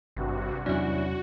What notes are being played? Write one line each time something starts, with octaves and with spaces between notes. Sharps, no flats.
G#1 G2 C3 F#4
E2 C3 F#3 C#4 D4 E4 F#4